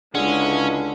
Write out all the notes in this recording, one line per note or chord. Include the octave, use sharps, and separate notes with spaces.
C#2 D3 G#3 C#4 E4